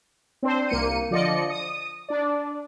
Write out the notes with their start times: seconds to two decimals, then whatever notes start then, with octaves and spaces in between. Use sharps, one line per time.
0.43 C4 D4 C5
0.69 C2 A#3 C#7 D#7
1.11 D3 F3 D5 D#5 C#7
1.50 D#6
2.09 D4 D5